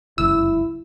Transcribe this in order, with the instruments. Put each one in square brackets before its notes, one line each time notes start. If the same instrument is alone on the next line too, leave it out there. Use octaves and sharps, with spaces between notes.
[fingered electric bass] F1 C#2 F#2 [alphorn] E4 [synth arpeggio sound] E6